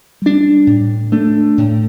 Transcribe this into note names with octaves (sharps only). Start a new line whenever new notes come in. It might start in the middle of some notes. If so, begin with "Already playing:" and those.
G3 D4
A2
A3 D4
A2